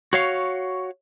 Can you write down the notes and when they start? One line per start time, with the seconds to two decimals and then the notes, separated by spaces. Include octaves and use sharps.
0.13 F#4 C#5 F5